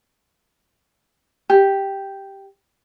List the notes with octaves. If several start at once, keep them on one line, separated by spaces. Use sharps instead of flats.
G4